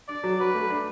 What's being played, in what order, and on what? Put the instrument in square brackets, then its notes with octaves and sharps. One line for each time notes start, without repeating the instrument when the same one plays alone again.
[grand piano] D4 [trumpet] D5
[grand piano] F#3
[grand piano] F#4 [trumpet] B4
[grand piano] A3
D4